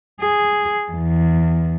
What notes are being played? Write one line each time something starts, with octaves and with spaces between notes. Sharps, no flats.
G#4
E2